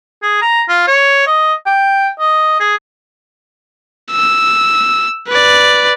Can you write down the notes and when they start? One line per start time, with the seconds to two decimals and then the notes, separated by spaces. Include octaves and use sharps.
0.22 G#4
0.42 A#5
0.68 F4
0.87 C#5
1.27 D#5
1.66 G5
2.19 D#5
2.60 G#4
4.11 E6
5.28 B4 D5